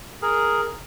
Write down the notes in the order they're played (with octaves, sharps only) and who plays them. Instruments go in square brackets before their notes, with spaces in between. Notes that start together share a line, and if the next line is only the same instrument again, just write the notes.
[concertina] G#4 A#4